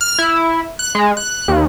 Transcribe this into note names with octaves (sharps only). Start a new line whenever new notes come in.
F6
E4
F#6
G#3
F#6
D#2